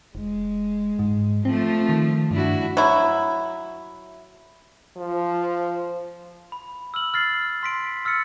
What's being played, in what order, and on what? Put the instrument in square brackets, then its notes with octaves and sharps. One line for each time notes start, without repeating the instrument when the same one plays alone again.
[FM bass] F1 [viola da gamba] G#3
[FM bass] G#2
[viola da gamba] F3 A3 [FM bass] C4
[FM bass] D#3
[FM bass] G2 [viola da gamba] D4 E4 F#4
[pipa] F#3 E4
[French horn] F3
[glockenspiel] B5
E6 F6 F#7
F6 A6 C7
C6 B6 D7
E6 F6 A6 C#7